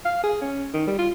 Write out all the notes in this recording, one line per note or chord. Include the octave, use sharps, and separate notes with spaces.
F5
G#4
C#4
D#3
G3
F4